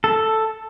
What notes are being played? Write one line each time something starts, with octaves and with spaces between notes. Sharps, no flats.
A4